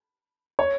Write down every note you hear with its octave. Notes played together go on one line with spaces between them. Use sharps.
C#5